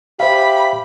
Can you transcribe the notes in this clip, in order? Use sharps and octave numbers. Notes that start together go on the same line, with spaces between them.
G4 C5 E5 F5 B5